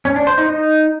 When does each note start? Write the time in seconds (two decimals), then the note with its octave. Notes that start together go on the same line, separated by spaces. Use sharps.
0.05 C#4
0.16 D4
0.27 C5
0.38 D#4
0.49 D#4